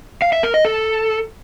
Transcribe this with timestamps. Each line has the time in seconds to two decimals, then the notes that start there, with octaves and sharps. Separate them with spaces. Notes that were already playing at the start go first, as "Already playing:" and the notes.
0.22 F5
0.33 E5
0.43 A#4
0.54 D#5
0.65 A4